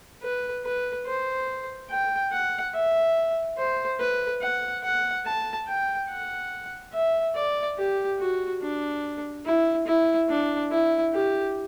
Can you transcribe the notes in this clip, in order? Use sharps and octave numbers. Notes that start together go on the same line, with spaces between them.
B4
B4
C5
G5
F#5
E5
C5
B4
F#5
F#5
A5
G5
F#5
E5
D5
G4
F#4
D4
E4
E4
D4
E4
G4